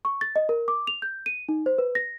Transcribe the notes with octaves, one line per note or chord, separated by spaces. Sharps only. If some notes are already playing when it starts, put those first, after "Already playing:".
C#6
A6
D#5
A#4
D6
F7
G6
D#7
D#4
C5
B4
A#6